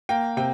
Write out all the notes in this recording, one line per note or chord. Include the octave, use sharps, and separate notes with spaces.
A#3 G5
C3 G5